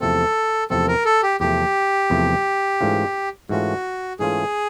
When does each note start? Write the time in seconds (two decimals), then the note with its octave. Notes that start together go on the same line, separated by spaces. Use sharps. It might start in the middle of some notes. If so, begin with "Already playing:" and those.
0.01 E2 C3 F3 A3 C4 A4
0.70 E2 C3 F3 A3 C4 A4
0.88 A#4
1.05 A4
1.23 G4
1.40 E2 C3 F3 A3 C4 G4
2.10 E2 C3 F3 A3 C4
2.81 G#2 E3 A3 C#4 F4
3.49 G#2 E3 A3 C#4 F4 F#4
4.19 G#2 E3 A3 C#4 F4 G#4